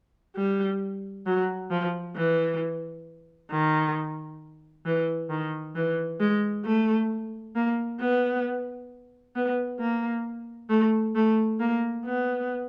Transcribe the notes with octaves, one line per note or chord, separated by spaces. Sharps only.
G3
F#3
F3
E3
D#3
E3
D#3
E3
G#3
A3
A#3
B3
B3
A#3
A3
A3
A#3
B3